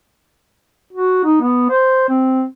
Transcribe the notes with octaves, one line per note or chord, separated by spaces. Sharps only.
F#4
D#4
B3
C5
C4